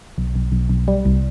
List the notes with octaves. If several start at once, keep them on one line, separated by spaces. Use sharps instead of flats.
B1
B1
B1
B1
G3
C2